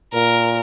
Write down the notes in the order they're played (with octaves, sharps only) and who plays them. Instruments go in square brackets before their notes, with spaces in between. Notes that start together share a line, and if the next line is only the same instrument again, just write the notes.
[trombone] A#2 [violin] A#4